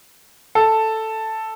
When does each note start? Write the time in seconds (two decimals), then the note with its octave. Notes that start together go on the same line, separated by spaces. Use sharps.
0.55 A4